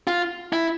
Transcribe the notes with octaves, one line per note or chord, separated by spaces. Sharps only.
F4
E4